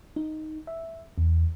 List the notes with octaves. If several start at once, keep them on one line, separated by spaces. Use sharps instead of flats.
D#4
E5
E2